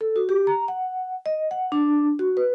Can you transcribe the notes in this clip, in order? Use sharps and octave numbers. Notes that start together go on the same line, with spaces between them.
A4
F#4
G4
A#5
F#5
D#5
F#5
D4
F#4
B4